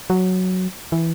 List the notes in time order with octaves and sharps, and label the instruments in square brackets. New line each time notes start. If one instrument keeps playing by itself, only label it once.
[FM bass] F#3
E3